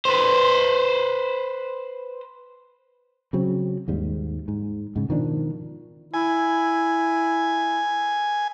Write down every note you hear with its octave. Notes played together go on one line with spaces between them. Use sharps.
B4 C5
C#3 F#3 C4
D#2 G#2 G3
G#2
G#2 C#3
B2 D#3 F3 D4
E4 G#5